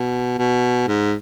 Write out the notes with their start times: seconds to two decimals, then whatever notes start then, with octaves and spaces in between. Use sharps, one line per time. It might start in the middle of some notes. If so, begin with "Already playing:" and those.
Already playing: B2
0.39 B2
0.88 G#2